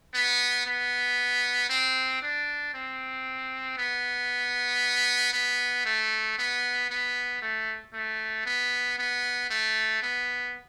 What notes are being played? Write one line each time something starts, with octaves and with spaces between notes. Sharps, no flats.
B3
B3
C4
D4
C4
B3
B3
A3
B3
B3
A3
A3
B3
B3
A3
B3